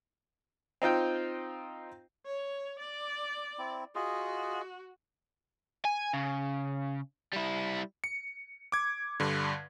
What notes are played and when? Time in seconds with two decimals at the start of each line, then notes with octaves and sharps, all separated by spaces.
0.82 C4 D#4 F4 G5
2.25 C#5
2.79 D5
3.59 C4 E4
3.95 F4 F#4 G#4 D#5
5.85 G#5
6.13 C#3
7.33 G3 E4
8.04 C#7
8.72 D6 G#6
9.20 G2 D3